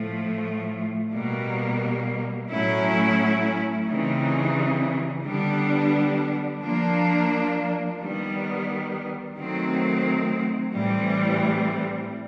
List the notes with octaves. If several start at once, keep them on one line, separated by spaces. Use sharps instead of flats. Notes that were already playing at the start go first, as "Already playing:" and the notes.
Already playing: A2 F3 A3
B2 G3 A#3
A2 F#3 A3 C#4 E4
C#3 E3 G3 C4 D#4
D3 G3 B3 D4
F3 A#3 D4
D#3 G3 B3
D#3 F#3 A3 C4
A2 E3 G3 C4